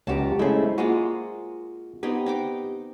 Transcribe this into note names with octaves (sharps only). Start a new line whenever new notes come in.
C#2 F#4 G4 A5 A#5
G#3 A3 C#4 E4 C5
G#3 A#3 F4 F#4
B3 C4 D#4 G4
D#4 G5 D6